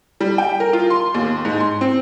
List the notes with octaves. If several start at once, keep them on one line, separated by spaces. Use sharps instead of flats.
G3
G5
A#4
F4
C6
D#2
G#2
C6
C4